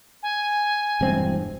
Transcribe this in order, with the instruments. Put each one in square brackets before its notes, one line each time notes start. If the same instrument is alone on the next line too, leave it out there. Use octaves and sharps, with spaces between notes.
[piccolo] G#5
[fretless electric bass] E1 G2 C4